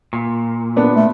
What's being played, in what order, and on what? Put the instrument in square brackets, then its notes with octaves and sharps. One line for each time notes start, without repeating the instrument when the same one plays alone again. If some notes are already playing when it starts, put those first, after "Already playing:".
[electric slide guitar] A#2
[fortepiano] B3 D4
[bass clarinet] A3